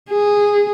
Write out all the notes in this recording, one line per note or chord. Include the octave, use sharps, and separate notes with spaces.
G#4